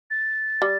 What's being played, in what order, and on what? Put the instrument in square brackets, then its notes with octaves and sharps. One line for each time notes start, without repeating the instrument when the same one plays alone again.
[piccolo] A6
[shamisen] G3